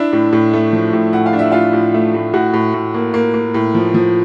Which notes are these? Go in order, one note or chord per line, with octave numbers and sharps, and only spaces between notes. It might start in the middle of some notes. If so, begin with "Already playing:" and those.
Already playing: D4 E4 E5
A2
A2
A3
F3
A2
A2 F#5
F5
D4
E5
A2 F4 F5
A2
A3
A2
A2 F#4 F#5
A2
A2
A#3
A#3
A#3
A2
F3
F3